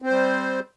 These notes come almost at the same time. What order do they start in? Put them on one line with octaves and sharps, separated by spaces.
C4 C5 G3